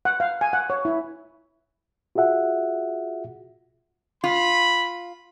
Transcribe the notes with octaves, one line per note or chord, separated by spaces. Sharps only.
F#5
F5
G#5
F#5
C#5
E4
F4 F#4 G#4 E5 F#5
F4 B5